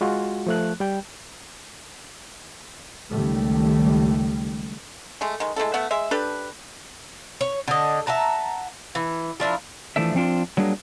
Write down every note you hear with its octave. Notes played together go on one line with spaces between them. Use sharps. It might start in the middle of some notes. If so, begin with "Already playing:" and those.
G#3 F4 F#4
F3 A3 F#6
G3 G5
C#2 D#3 G3 A3
G#3 A3
D#3 G#3
G#3 A3 E4 A4
A3 B3 E5 F#5
G#3 E5
D4 G4 A4 B4
C#5
D3 D#5
E5 F#5 A5 A#5
E3
F3 D4 E4 A#4
E3 F3 A3 D4 E5
F3 C4 D4 F4
F#3 G3 A#3 D4 G#4